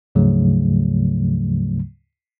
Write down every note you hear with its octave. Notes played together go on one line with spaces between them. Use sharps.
D2 G#2 C#3 F3 F#3 A3